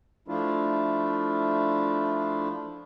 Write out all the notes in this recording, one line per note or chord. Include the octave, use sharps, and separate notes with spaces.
F3 A3 D4 E4 F4